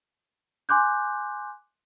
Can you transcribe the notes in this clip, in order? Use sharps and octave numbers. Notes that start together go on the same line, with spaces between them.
G#5 C6 D6 F#6 G6